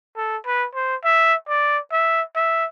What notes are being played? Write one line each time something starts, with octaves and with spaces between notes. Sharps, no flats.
A4
B4
C5
E5
D5
E5
E5